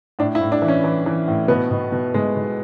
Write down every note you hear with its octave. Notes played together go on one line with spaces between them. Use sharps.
A2 D4
E4
A2
D4
E3
C#4
E3
E3
A2
B2 B3
B2
B2
B2 G#3
B2